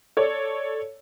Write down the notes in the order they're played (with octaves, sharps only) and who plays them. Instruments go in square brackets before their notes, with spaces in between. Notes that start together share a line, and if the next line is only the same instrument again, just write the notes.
[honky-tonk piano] A4 C#5 D5